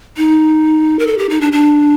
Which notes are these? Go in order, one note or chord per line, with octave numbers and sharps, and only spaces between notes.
D#4
A#4
A4
G4
D#4
D4
D4